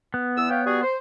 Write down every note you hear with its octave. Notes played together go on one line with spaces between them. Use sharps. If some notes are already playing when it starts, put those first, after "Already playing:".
B3
E2 E6
C#5 F5 G5
G3 F#4 G#4
C5